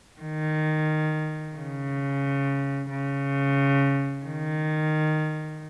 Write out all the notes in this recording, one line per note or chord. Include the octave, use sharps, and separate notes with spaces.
D#3
C#3
C#3
D#3